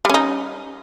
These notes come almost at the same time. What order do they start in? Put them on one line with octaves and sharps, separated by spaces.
G3 C#4 D#4